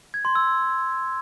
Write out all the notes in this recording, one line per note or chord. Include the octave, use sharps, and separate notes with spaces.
G#6
C6
E6